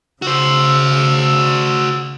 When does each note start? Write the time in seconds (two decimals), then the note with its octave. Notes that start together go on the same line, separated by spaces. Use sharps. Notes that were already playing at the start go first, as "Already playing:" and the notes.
0.22 C#3 F#4 C5 E6